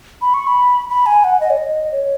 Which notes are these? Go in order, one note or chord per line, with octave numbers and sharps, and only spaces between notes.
B5
C#6
B5
B5
G#5
F#5
D#5
C#5
D#5
C#5